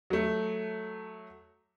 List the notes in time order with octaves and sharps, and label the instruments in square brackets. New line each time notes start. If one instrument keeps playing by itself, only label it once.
[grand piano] F#3 A3